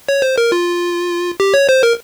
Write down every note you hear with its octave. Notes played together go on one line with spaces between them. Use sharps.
C#5
C5
A#4
F4
G4
C#5
C5
A#4